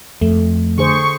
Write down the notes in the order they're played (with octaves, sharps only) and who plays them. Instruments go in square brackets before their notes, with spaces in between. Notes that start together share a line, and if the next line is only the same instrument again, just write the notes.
[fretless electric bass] F2 [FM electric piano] A3
[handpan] D3 G#4 C5 [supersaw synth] C#6